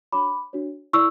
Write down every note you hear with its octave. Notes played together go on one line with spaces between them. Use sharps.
D4 F#4 C#5 B5 D6
D4 F#4 C#5
E4 A4 D5 C#6 E6